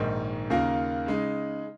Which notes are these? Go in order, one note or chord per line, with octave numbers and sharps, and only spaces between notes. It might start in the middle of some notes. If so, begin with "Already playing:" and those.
Already playing: A#1 G#2 D#3
D#2 C#3 A#3 F4 A#4
C#3 G#3 D#4